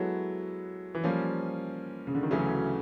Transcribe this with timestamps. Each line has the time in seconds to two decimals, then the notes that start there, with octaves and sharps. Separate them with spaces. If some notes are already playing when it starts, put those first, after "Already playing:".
Already playing: F#3 G#3 B3 E4 A4 C#5
0.95 E3
1.04 F3 G3 A#3 C#4
2.07 C#3
2.15 D3
2.23 D#3
2.31 D2 C#3 E3 F#3 A3 C#4